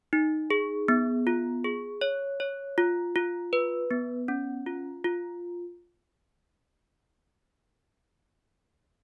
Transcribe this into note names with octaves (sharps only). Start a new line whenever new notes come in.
D#4
G#4
B3
F4
G#4
C#5
C#5
F4
F4
B4
B3
C#4
F4
F4